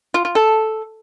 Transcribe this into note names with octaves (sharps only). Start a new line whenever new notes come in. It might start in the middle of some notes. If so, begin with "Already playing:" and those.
F4
F4
A4